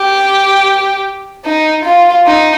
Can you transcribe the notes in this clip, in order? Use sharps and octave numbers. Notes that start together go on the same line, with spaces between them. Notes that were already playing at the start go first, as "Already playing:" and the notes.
Already playing: G4
D#4
F4
D#4